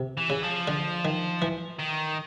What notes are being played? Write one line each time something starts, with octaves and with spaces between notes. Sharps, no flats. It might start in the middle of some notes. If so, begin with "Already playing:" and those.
Already playing: C3
E3
C#3
F3
D3
D#3
E3
D#3